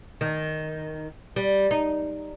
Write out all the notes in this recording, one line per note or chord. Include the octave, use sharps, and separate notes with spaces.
D#3
G3
D#4